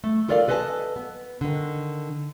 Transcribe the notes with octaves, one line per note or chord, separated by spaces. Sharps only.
A3
F4 A4 A#4 D5 E5 F5
A4 B4 D#5 F5 G#5 A5
B3
D3 D#3